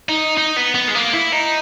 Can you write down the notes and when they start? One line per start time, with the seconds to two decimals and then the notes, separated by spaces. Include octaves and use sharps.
0.09 D#4
0.37 D#4
0.56 B3
0.75 B3
0.88 G#3
0.95 A#3
1.13 E4
1.33 D#4